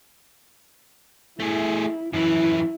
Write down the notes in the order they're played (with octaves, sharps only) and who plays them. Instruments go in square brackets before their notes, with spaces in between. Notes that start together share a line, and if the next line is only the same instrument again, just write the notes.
[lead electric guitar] A3 G#4 [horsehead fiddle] E4
[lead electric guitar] F#2 E3 [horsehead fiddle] E4